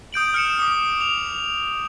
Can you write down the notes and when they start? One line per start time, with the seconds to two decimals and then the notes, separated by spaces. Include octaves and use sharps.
0.13 D#6 G6 D7 F#7
0.34 F6 C#7 E7
0.59 D6 D#6
1.01 F7